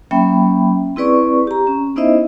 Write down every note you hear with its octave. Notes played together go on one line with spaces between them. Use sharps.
F#3 A#3 C#4 E5 G5 B5
C4 E4 G#4 B4 D5 C#6
G4 A#5
C#4
B3 D#4 E4 C5 D#5 E5